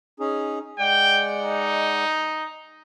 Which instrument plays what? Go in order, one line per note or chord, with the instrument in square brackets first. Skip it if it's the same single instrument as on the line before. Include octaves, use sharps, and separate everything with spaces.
[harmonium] C#4 D#4 G#4
[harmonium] G#3 D5 F#5 [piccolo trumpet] G5
[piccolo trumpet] D#4